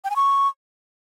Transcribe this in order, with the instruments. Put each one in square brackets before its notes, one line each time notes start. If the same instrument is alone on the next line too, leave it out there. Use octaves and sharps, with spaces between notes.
[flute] G5
G#5
C#6